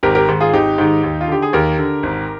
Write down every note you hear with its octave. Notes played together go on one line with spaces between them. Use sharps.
G#1 G4 A#4
G4 A#4
G#2 D#3
F4 G#4
G#1 D#4 G4
G#2 D#3
D#2
F4
D3 G4
G#4
D#2 G4 A#4
D3
G#1